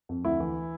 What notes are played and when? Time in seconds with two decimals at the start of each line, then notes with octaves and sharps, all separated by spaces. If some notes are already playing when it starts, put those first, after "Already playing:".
0.09 F2
0.25 D2 E4
0.40 E3